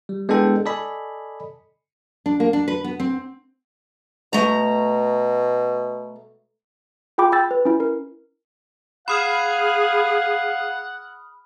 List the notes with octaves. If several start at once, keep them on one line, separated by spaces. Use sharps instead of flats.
G3
G#3 B3 D4 E4 A4 G5
A4 D5 D#5 G#5 B5
D4
A#3
D4
B4
B3
C4
B2 A3 A#5
F4 G#4 G5 B5 D6
G5 B5 E6 A6
B4
C#4 E4
A#4
G#4 F5 F#5 B5 D#6 F6